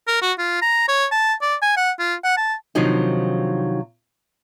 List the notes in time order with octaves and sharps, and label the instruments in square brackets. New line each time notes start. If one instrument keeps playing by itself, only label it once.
[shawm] A#4
F#4
F4
A#5
C#5
A5
D5
G#5
F#5
F4
F#5
A5
[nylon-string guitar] C3 D#3 F3 F#3 D4 D#4